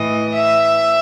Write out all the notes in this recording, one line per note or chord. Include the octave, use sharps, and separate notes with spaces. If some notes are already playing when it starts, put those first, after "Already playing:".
Already playing: A2 E3 D#5
E5